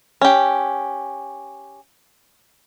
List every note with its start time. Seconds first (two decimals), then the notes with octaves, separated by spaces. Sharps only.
0.21 C#4 G4